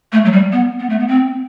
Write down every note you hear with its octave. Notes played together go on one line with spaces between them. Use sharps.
A3
F#3
G3
B3
B3
A3
B3
C4